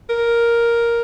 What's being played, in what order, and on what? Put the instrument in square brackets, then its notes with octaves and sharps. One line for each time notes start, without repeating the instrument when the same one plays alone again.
[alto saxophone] A#4